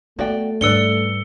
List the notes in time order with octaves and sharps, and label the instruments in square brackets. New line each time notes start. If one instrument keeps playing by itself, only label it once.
[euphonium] A3 [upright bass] B3 [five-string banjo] F#4 D5 G5
[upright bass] G#2 G3 [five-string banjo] D4 B4 D5 [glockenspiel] E6 C#7 G7